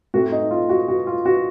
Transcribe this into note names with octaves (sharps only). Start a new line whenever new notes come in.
A2 A3 C4 F#4
D#4
F4
F#4
F#4
F4
F#4